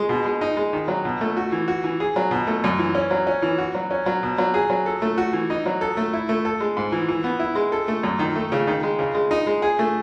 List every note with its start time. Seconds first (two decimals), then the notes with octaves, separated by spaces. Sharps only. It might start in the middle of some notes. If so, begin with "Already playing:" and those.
Already playing: G#3
0.09 B2
0.25 G#3
0.41 D#4
0.57 G#3
0.73 D#3
0.88 F#3
1.05 B2
1.21 A3
1.37 F#4
1.52 E3
1.68 F#4
1.84 E3
2.00 G#4
2.16 F#3
2.31 B2
2.47 A3
2.64 F#2
2.79 E3
2.95 C#4
3.11 F#3
3.27 C#4
3.42 E3
3.58 F#4
3.74 F#3
3.91 C#4
4.06 F#3
4.23 B2
4.38 F#3
4.54 G#4
4.70 F#3
4.86 A4
5.02 A3
5.18 F#4
5.33 E3
5.50 D#4
5.66 F#3
5.81 A4
5.97 A3
6.13 E4
6.29 A3
6.45 A4
6.60 G#3
6.77 G#2
6.92 E3
7.08 E3
7.24 B3
7.39 E4
7.55 G#3
7.72 A4
7.88 A3
8.03 F#2
8.19 D#3
8.35 A3
8.52 C#3
8.67 D#3
8.83 G#3
8.99 C#3
9.14 G#3
9.31 D#4
9.47 G#3
9.62 G#4
9.79 A3